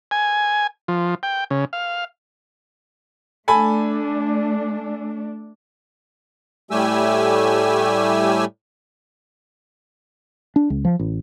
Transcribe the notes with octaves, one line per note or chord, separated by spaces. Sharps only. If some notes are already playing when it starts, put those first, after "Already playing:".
G#5
F3
G5
C#3
F5
A3 D4 A4 G#5 B5
A2 G3 A3 G4 G#5 E6
D4
C#2
F3
A1